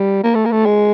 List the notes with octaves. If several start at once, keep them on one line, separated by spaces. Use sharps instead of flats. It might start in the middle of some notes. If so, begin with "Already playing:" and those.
Already playing: G3
A#3
A3
A#3
A3
G#3